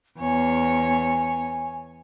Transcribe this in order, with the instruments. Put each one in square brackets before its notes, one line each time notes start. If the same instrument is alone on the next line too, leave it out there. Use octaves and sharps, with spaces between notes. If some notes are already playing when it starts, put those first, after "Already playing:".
[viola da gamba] E2 C#5 [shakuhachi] G#5